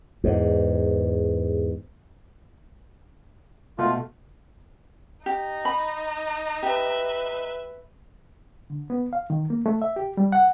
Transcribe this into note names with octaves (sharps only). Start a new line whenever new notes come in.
E2 G#2
B2 A3 F4
D#4 G4
B5
G4 B4 E5
D3
B3
F5
D#3
A#3
A3
E5
G4
G3
F#5